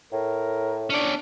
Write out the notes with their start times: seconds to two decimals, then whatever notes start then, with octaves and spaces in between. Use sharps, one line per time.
0.13 A2 A#4
0.90 C#4 D4 D5